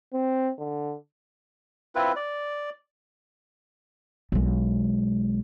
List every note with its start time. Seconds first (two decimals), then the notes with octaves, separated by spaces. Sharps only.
0.13 C4
0.59 D3
1.95 C4 E4 F4 B4
2.16 D5
4.32 B1 G#3